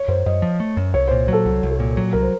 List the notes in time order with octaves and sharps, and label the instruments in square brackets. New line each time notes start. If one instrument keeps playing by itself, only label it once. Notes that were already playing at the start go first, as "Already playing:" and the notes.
Already playing: [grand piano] C#5
[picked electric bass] F#2 [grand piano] C5
[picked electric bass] F#2 [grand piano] D#5
[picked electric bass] F3
A3
F#2
[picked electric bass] C2 [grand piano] C#5
[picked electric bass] A#2 [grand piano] C5
[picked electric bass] F#3 [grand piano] A4
[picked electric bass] C2 [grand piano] F#4
[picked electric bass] C2
[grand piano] A4
[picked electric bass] A#2
F#3
[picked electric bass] C2 [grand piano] A#4
[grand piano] C5